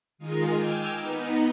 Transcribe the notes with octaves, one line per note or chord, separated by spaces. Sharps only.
D#3 G#3 D#4 F4 G#4
G5 G#5 D6 E6 F6
B3 D#4